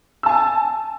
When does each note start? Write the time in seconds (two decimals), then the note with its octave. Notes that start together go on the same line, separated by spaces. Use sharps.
0.23 E6
0.26 A5
0.29 G#5